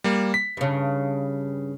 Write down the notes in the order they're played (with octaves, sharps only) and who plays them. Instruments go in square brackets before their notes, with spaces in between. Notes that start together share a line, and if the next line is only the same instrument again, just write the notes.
[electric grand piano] G3 A#3
B6
[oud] G2 C#3